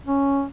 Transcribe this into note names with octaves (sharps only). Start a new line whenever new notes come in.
C#4